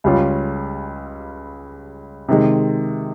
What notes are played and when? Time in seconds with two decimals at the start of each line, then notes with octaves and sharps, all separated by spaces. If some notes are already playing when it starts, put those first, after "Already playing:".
0.04 C#2 C#3 G3 C#4 F4
2.28 C3 D#3 G#3